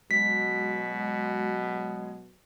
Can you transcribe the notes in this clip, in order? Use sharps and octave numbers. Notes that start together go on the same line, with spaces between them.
B2 F#3 G#3 B6